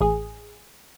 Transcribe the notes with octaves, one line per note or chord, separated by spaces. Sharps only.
A1 G#4